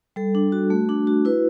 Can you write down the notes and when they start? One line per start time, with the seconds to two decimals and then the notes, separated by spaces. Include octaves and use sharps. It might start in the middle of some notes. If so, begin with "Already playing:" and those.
0.16 G3 A4
0.35 D4
0.52 F#4
0.70 A3
0.89 D4
1.07 F#4
1.25 E4 B4